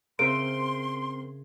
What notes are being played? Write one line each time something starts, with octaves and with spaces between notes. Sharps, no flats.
C#3 C4 A#4 C5 E5 C6 D7